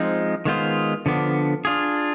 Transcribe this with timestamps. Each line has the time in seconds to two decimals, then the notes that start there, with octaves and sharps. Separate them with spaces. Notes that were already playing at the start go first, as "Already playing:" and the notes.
Already playing: F3 G#3 C4 D#4
0.45 D#3 G#3 B3 F4 C5
1.06 D3 F3 B3 D4
1.65 D4 F4 G#4